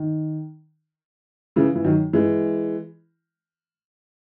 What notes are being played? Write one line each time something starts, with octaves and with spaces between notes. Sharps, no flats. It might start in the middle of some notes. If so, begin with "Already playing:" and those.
Already playing: D#3
C#3 E3
E3
D#3 F#3
E3 G#3